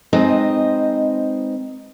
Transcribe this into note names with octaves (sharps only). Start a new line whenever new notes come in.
G#3 C4 D#4 B4 C5 D#5